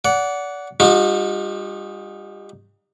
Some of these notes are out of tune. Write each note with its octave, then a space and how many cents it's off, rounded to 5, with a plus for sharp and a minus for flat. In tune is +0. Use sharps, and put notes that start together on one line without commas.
D5 -30 F#5 +0
G3 +30 D#4 +0 F#4 -40